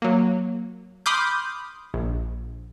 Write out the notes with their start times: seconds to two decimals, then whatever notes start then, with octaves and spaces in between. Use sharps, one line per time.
0.02 F#3 A#3
1.06 B5 C6 D6 D#6 F6 G6
1.94 A#1